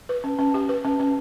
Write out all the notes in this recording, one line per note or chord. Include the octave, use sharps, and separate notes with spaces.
B4
C#4
C#4
G4
B4
C#4
C#4